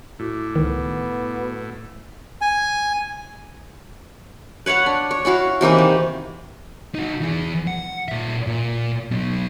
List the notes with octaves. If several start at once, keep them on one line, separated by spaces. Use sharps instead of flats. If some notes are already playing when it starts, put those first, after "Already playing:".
A2 E4 F#4 D6
C#2 D#3 B3
G#5
B4 C#5 F5 F#5
D4
C#5
C#4 E4 F#4 F5
C3 E3 A#3 D#4
D#3
D#4 F#4
E3 G#4
F#5
A#2 E5
A#2
F#3 B3